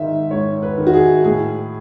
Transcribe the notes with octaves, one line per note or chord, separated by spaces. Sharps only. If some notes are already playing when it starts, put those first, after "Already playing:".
Already playing: G#2 D#3 E5
G#2 C#5
B4
D#3
F#4
G#4
A2 G#4